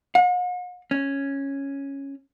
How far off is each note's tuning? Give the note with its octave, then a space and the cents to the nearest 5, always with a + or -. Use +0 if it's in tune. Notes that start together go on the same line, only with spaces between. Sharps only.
F#5 -45
C#4 -5